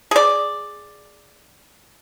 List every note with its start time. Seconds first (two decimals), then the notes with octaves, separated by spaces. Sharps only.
0.11 G#4 D5